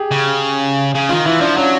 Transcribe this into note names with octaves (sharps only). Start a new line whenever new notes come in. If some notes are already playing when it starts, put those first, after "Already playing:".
Already playing: G4 G#4
C#3
C#3
D#3 F4
E3 E4
F3 D4
F#3 C#4